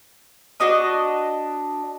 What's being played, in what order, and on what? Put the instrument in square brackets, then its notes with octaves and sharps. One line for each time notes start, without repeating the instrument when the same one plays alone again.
[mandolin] D4 F#4 D#5 D#6